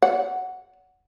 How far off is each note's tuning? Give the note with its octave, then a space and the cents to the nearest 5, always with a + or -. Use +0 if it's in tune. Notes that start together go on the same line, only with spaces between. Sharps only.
C#5 +45 F#5 +0